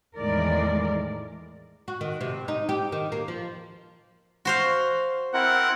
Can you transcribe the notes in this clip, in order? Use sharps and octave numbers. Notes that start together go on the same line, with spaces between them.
E2 A2 D#3 G#3 A#4 D5
F#4
D#3
C3
D#4
G4
D#3
A#3
F3
F#4 C5 F5
C4 E4 A#4 F#5